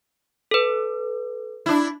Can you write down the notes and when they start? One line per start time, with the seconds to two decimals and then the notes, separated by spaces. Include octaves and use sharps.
0.51 A4 B4
1.66 D4 E4